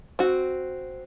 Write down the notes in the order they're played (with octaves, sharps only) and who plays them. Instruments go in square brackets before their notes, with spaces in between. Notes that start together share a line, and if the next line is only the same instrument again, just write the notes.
[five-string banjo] C4 F#4